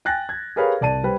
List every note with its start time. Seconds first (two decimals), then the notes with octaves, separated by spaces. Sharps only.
0.05 G5 G#5 F#6 A6 A#6
0.29 G#6
0.56 G4 G#4 A#4 B4 C#5 F5
0.81 C2 D5 A5 D#7
1.04 G3 B4 C5